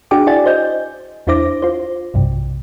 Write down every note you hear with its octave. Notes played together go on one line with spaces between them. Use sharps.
D4 F#4 G#4 G5 D6
E4 F#4 D5 G#5 A6
C5 D#5 G6
E2 D4 E4 C5 D6 A#6
F4 C5
B1 G2 C3